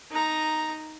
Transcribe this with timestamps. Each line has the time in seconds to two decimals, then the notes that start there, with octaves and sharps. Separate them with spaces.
0.11 D#4 A#5